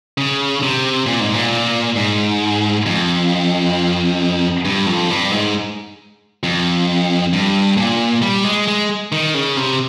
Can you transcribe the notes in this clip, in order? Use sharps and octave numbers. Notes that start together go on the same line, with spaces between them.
C#3
C3
A#2
G#2
A#2
G#2
F2
G2
F2
G2
G#2
F2
G2
A#2
G3
G#3
G#3
D#3
C#3
C3